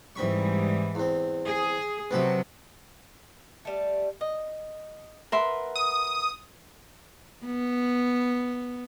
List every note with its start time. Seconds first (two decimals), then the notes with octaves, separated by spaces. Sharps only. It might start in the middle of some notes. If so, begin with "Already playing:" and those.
0.16 G#2 E3 G3 C4 B5 C#6
0.95 E2 C4
1.47 G#4
2.11 C3 F#3 B3 C4 A4
3.65 G3 A3
4.21 D#5
5.32 A#4 B4 E5 F#5 C6
5.76 D#6
7.45 B3